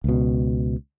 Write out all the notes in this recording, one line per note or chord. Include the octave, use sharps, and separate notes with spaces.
C#2 B2